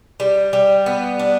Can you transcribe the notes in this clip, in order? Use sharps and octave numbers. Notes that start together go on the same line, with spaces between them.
G3
G3
B3
D4